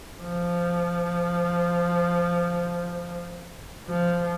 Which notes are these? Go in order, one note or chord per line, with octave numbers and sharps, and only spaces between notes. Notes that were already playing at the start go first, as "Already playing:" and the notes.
F3
F3